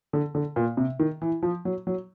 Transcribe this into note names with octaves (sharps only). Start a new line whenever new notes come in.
D3
D3
A#2
C3
D#3
E3
F3
F#3
F#3